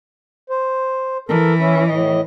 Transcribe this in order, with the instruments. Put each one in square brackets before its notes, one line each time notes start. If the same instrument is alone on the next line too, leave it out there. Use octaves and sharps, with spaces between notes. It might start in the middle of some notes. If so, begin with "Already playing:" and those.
[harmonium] C5
[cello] E3 [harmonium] A4 A#4
[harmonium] C#4 E4
A2 D#5